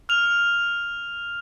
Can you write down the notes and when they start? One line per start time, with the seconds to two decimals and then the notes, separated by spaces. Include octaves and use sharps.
0.09 F6 F7